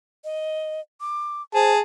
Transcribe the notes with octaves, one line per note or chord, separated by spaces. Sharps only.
D#5
D6
G#4 C5 A5